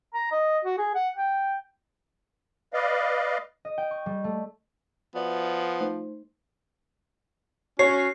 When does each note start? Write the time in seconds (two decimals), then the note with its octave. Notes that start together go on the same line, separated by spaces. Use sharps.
0.14 A#5
0.32 D#5
0.65 F#4
0.78 G#4
0.95 F#5
1.17 G5
2.74 B4 D5 D#5 F5
3.65 D#5
3.78 G5
3.91 C#6
4.06 G3
4.24 A3
5.15 F3 B3 F#4 D5 E5
5.80 A3 D#4 C5
7.79 C#4 F#4 C#5 C7